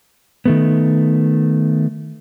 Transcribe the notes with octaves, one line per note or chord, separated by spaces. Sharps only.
D#3 A3 B3